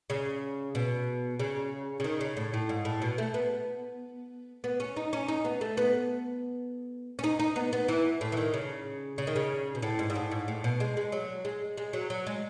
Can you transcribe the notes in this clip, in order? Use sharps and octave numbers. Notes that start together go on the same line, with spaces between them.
C#3
B2
C#3
C#3
D#3
C#3
A2
A2
G#2
A2
B2
A3
B3
B3
C#4
D#4
C#4
D#4
B3
A3
B3
C#4
D#4
D#4
B3
B3
E3
A2
E3
D#3
C#3
C#3
D#3
C#3
B2
A2
G#2
G#2
A2
G#2
A2
B2
G#3
G#3
F#3
G#3
G#3
F#3
F#3
G#3